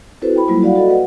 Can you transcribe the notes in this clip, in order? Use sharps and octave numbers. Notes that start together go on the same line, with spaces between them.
C4 E4 F#4 A4 B4 C5
G5 B5
F#3 G3 A#3 E4 F4
F#4 D5 F5 F#5
F#4 A4 D5 D#5
B4 F#5